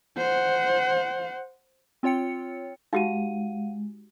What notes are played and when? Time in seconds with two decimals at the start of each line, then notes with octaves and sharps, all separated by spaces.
0.17 C5 F#5
2.03 C4 F4 C#5 G5 C#7
2.93 G#3 D#4 F#4 G4 F5 F#5 D#7